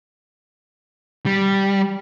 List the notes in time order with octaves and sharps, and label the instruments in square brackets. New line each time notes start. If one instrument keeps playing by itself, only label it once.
[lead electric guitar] G3